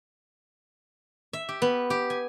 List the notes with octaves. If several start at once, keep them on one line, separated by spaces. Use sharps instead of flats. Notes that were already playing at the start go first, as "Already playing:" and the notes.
E5
G4
B3
G4
G#5